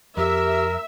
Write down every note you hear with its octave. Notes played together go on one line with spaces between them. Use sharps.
F2 F3 G4 A#4 E5